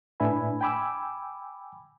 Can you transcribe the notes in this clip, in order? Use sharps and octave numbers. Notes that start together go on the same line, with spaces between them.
A2 D4 B4 E5 G#5 B5
G5 G#5 B5 D6 E6